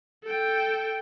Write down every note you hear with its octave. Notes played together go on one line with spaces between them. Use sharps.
A4 G5